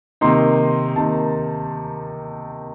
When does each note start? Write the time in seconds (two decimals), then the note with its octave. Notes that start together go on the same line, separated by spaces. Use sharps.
0.21 C3 D#3 A#3 D#4 C6
0.96 C3 D#3 A#3 D#4 A5